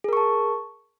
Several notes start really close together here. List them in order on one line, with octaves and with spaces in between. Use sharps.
G#4 A#4 C#6 A5